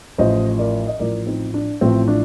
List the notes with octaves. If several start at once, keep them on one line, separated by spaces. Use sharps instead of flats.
A1 A2 F3 C5 D#5
A#4 D5
D#5
A1 A2 F3 A#4 D5
C4 D#4
D4
A1 A2 F3 C4
D4